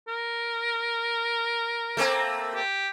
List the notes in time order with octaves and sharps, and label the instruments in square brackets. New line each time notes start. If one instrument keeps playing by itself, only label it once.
[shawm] A#4
[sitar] A3 A#3 C4
[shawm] G4